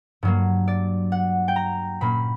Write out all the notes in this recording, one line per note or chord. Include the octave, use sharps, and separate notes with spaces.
G2 F#3 A#3
D5
F#5
G5
A#5
A#2 A#3 C#4 B5